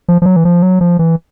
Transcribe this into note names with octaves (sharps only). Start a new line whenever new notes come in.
F3
F3
F#3
E3
F3
F#3
F3
E3